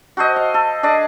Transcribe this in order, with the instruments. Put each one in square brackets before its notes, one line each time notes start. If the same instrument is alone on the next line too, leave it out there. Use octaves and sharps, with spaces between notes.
[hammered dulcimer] F#4 A4 C5 D#5
F5
A4
D4 G#4 D5 D#5